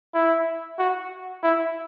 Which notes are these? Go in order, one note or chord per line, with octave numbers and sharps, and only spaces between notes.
E4
F#4
E4